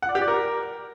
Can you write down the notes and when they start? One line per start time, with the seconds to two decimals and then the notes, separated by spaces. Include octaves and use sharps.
0.02 F#5
0.09 D5
0.15 G4
0.21 D5
0.28 A#4